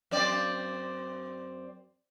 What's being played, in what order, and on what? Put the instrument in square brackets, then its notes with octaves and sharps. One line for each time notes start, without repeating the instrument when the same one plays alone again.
[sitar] F#2 C4 D5